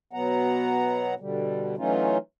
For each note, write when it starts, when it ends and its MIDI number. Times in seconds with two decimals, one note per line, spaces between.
0.13 1.14 47
0.13 1.14 54
0.13 1.14 59
0.13 1.14 78
0.13 1.14 82
1.20 1.75 47
1.20 1.75 50
1.20 1.75 55
1.77 2.18 52
1.77 2.18 54
1.77 2.18 57
1.77 2.18 61
1.77 2.18 63
1.77 2.18 65